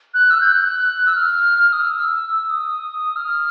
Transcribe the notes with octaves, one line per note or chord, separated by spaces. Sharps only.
F#6
E6
G6
F#6
E6
F6
D#6
E6
D#6
F6